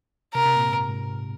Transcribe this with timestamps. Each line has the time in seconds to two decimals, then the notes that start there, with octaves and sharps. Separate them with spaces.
0.34 C3 A#4
0.45 C3
0.56 A#2
0.68 G#2
0.78 A#2
0.89 G#2